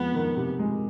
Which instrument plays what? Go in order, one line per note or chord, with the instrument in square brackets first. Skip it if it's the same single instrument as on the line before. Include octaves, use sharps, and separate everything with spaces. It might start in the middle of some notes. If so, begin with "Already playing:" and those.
Already playing: [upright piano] F2 G#3 [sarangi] B3
[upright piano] D#3
C3
G#3